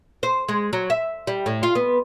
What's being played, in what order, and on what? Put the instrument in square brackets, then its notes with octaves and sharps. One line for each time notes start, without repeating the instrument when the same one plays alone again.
[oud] C5
G#3
F#3
E5
G3
A2
F4
B3